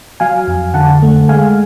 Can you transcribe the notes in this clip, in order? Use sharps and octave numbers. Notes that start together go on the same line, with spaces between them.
F#3 F5 G#5
F2
D3 F#5 A5
A3
G#3 F5 G#5